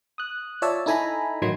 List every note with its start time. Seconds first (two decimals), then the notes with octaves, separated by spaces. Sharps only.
0.18 D#6 F#6
0.62 F4 C#5 D5 E5 A5 E6
0.86 D#4 E4 A4 G#5 A#5 B5
1.42 A1 D#3 F#3 D#4 C6 G#6